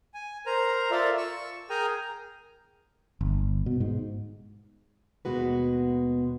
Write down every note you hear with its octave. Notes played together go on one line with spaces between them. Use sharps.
G#5
A#4 C5 A#5
F4 A4 A#4 D5 E5
C#6 E6
G#4 A#4 G5 G#5 A#5
G1
B2
G#2
D#2 B2 G#3 F#4 B4